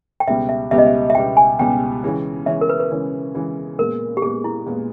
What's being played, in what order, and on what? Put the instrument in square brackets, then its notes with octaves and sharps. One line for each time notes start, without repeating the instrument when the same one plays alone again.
[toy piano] G5
[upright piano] C#2 B2 G3 B3 G4 [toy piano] E5
[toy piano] E5
[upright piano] C#2 B2 G3 B3 G4 [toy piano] E5
[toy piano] D#5
E5
E5
[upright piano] C#2 B2 G3 B3 G4 [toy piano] G5
[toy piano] G#5
[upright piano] C#2 B2 G3 B3 G4 [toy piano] G5
[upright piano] C#3 E3 G#3 C#4
[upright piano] C#3 E3 G#3 C#4 [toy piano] E5
[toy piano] A#4
B4
B4
[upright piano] C#3 E3 G#3 C#4
C#3 E3 G#3 C#4
[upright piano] A#2 G#3 B3 [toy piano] A#4
[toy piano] G4
[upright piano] A#2 G#3 B3 [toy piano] G#4
[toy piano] E4
[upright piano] A#2 G#3 B3